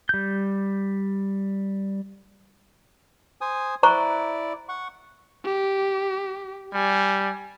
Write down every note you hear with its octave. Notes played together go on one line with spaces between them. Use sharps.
G3 G6
C5 G#5 D#6
E4 C5 D5 A#5 C#6
F#5 C#6
G4
G3 G#5